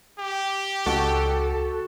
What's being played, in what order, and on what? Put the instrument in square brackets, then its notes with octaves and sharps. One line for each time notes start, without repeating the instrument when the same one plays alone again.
[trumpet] G4
[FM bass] C#2 [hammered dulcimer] F#4 [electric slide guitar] A4